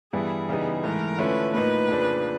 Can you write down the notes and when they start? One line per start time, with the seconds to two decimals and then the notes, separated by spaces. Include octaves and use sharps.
0.13 G2 E3 G3 B3 E4 G#4
0.49 C#3 E3 G3 B3 D#4
0.83 G#2 E3 A3 A#4
1.18 D3 F3 A3 C#4 E4 B4
1.54 A2 F3 A#3 D#4 B4
1.88 F2 C#3 F3 A#3 D4